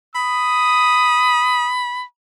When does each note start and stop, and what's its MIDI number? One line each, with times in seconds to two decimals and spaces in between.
0.15 2.02 83
0.15 1.72 87